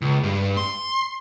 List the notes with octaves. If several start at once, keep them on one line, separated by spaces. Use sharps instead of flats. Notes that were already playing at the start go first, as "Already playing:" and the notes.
C#2
G2
C6